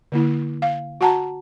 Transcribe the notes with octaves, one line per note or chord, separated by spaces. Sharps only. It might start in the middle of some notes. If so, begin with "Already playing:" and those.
D3 A#3 E4
F5
F#4 F#5 A5 A#5